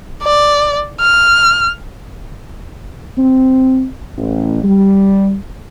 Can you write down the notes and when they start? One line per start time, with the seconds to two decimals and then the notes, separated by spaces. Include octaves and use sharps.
0.23 D5
1.00 F6
3.16 C4
4.16 A1
4.63 G3